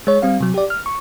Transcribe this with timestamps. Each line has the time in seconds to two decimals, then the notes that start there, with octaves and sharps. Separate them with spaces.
0.07 G#3 C#5
0.22 G3 C4 F5
0.40 C3 F#3
0.54 G4 D5
0.70 F6
0.86 C#6